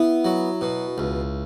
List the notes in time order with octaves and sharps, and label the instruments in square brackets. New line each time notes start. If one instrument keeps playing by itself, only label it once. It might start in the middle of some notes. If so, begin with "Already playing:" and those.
Already playing: [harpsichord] B3 [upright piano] E4
[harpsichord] F#3
B2
C#2